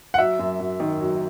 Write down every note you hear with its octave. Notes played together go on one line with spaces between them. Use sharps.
F#5
F#3 E5
F#2
F#2
D#3
F#3